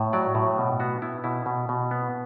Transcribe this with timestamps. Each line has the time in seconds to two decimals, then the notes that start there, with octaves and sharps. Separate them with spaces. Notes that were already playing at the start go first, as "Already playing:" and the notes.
Already playing: A2
0.13 F#3 D5
0.35 A2
0.58 B2
0.80 B3 F#4
1.02 B3 E4
1.24 B2 E4
1.46 B2
1.69 B2
1.91 B3